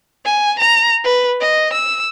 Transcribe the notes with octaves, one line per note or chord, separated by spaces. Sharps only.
G#5
A#5
B4
D#5
E6